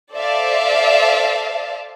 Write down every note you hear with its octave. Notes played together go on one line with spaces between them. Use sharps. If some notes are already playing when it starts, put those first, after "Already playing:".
A4 C5 D5 E5 F5 A5